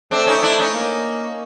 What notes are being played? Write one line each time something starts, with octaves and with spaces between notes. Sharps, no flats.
A3 C4 D4
C#4 D#4
D4 E4
C#4 D#4
A#3